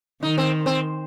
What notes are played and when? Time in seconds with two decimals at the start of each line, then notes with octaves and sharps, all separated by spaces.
0.23 D#3 D#4
0.38 C4
0.66 C4